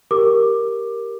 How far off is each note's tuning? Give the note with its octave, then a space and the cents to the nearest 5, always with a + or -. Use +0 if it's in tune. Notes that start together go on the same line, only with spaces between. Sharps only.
G4 +0 A#4 +0 D6 +15